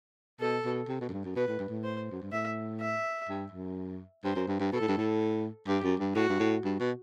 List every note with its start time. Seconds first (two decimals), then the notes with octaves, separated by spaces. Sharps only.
0.40 B2 A4
0.65 B2
0.88 C3
1.01 B2
1.09 F#2
1.12 G2
1.25 F#2
1.36 B2 B4
1.48 A2
1.59 G2
1.69 A2
1.84 C5
2.11 F#2
2.22 G2
2.32 A2 E5
2.81 E5
3.29 G2
3.52 F#2
4.24 G2 C5
4.36 F#2
4.48 G2
4.60 G2
4.72 B2 A4
4.81 A2
4.88 G2
4.97 A2
5.67 G2 G4
5.83 F#2
6.00 G2
6.15 A2 F#4
6.29 G2
6.40 A2
6.65 G2
6.80 B2